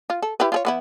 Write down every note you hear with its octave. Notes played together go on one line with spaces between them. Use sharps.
F4
A4
E4 G4 B4
F4 G#4 C#5
E3 B3 E4